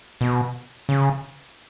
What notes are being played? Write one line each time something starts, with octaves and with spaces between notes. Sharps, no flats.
B2
C#3